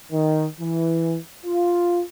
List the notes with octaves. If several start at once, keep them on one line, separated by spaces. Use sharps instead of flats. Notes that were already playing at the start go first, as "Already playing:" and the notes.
D#3
E3
F4